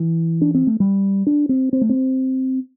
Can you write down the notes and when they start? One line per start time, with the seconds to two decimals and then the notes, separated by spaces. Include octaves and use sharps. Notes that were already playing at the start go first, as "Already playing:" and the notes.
Already playing: E3
0.41 D4
0.55 C4
0.67 A3
0.80 G3
1.27 D4
1.49 C4
1.73 C4
1.81 A3
1.89 C4